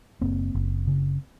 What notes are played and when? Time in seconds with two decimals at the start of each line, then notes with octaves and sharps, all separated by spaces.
0.21 F#1 A#3 C4
0.54 F#1
0.87 C#3